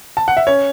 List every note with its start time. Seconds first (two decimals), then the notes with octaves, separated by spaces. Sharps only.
0.17 A5
0.28 F#5
0.37 E5
0.47 C#4 C#5